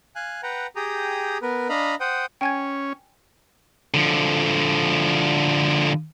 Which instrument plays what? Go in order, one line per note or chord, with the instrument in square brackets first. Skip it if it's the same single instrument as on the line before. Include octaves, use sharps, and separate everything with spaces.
[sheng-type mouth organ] F5 G#5 F#6
B4 F#5 G5 A#5
G4 G#4 G5 A#5 D#6
B3 A#4 B4
D4 D#5 F5 A#5 B5
C5 F#5 G5 D#6
[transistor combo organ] C#4 [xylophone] G5 G#5 G#6
[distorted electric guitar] D3 F3